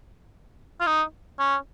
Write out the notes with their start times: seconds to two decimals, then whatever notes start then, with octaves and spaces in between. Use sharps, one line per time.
0.80 F4
0.86 D#4
1.39 C#4